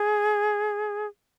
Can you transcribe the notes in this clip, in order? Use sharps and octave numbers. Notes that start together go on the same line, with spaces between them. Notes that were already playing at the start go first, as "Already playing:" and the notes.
Already playing: G#4